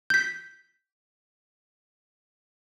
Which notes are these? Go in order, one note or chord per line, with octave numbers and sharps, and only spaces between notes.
G6 B6